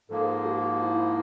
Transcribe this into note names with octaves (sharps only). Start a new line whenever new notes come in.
G#2 F3 A#3 A4
G#4
A4
F#4
G4
F#4
F#4
E4
E4